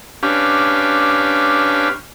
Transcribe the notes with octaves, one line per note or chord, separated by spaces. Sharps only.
C#4 D4 G4 B4 F5